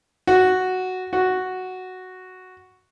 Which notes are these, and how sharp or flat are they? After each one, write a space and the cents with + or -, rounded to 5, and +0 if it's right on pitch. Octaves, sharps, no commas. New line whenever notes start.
F#4 +0
F#4 +0